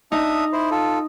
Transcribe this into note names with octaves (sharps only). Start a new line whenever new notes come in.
D4 D#4 E5 D#6
E4 C5
F4 A4